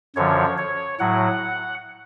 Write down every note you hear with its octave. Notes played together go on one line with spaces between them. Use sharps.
F#2 D3 F3 C#5
C#5
A2 F#3 F#5